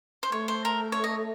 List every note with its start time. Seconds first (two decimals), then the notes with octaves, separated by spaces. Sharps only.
0.23 C5
0.32 A3 C#5
0.48 C5
0.65 A#4
0.92 C#5
1.04 D#5